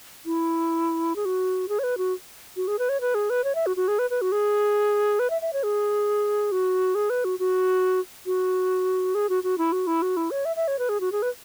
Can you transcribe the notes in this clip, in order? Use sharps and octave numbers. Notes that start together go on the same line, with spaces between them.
E4
G#4
F#4
G#4
C#5
B4
F#4
F#4
G#4
B4
C#5
B4
G#4
B4
C#5
E5
F#4
F#4
G#4
B4
B4
F#4
G#4
B4
E5
E5
C#5
G#4
F#4
G#4
B4
F#4
F#4
F#4
G#4
F#4
F#4
E4
F#4
E4
F#4
E4
C#5
E5
E5
C#5
B4
G#4
F#4
G#4
B4